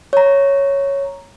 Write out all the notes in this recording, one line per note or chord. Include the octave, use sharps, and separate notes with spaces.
C#5 A#5